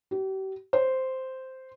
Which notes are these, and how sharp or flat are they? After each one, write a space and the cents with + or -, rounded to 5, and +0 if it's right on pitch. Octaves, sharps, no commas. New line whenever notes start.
G4 -40
C5 -5